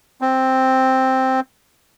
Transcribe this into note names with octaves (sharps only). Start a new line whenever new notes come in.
C4